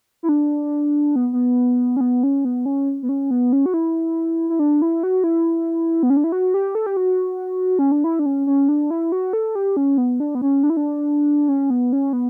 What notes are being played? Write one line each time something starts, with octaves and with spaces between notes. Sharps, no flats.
E4
D4
B3
B3
C#4
B3
C#4
B3
C#4
B3
C#4
B3
C#4
F#4
E4
E4
D4
E4
F#4
E4
B3
C#4
D4
E4
F#4
G4
A4
G4
F#4
C#4
D4
E4
D4
C#4
C#4
D4
E4
F#4
A4
G4
C#4
B3
D4
B3
C#4
D4
E4
D4
C#4
B3
C#4
B3